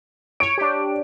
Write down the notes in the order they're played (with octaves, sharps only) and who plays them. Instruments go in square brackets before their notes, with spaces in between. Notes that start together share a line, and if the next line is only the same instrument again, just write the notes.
[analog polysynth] C#5 [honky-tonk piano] D7
[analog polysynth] D4 G4